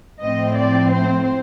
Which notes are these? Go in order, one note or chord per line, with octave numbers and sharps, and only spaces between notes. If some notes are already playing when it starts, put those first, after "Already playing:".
A2 F3 C4 D#5
D5
C5